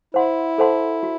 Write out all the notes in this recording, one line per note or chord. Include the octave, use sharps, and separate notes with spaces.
E4 C5 F#5 C6
A4 C5 F#5 A5 C6
F#4